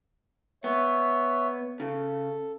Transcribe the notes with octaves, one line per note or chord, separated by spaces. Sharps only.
B3 C#5 E5
C#3 A4